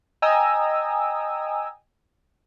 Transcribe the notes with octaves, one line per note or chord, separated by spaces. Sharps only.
D#5 G5 G#5 A#5 D#6 E6